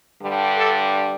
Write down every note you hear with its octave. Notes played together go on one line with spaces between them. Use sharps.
G2 D3 G3
A4